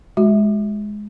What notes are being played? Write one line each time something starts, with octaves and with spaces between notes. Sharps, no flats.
G#3 F#4